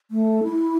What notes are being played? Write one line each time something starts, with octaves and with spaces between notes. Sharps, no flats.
A3
E4